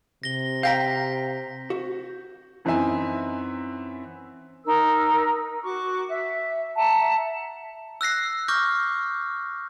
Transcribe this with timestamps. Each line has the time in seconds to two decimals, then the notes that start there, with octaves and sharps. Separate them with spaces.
0.23 C3 A#6 G7
0.63 F5 G5 A#5 G6 A#6 B6
1.70 F#4
2.65 F#2 E3 C4 D#4 E5 G#5
4.65 D#4 A#4 E6
5.64 F#4 C#6 D6
6.09 E5
6.76 E5 F#5 A5 A#5
8.01 E6 F#6 A#6 C7
8.48 C#6 D6 F6 G6 A#6